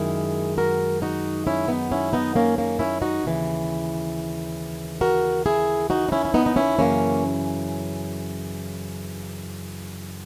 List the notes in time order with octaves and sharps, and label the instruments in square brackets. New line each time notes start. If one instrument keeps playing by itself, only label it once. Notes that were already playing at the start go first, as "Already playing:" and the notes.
Already playing: [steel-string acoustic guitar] F#2 D#3 G#3 E4 G#4
F#4 A#4
D#4 F#4
C#4 E4
B3 D#4
C#4 E4
B3 D#4
A#3 C#4
A#3 C#4
C#4 E4
D#4 F#4
D#2 C#3 E3
F#4 A#4
E4 G#4
D#4 F#4
D#4
C#4 E4
E4
B3 D#4
D#4
C#4 E4
F#2 C#3 E3 A#3 C#4